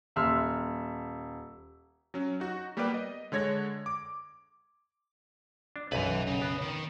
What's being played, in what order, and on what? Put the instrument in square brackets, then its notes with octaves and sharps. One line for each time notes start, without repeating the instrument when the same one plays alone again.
[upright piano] D#1 E5 C6 E6 F6
[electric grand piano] F#3 C#4
D#4 F#4
G3 A#3 B3 G4 B4 D5
D#5
D3 G#3 C#5 G#6 A#6
D6
[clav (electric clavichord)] D4
[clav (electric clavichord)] B1 F#2 [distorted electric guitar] B4 G#5
[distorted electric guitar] C#3
[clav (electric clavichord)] B3
[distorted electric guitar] D#3